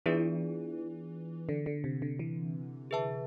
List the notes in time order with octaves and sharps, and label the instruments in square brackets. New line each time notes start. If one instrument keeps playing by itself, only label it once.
[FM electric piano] E3 [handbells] B3 D4 F4 G#4 D5
[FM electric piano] D3
D3
C3
D3
E3
[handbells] G#4 B4 E5 A5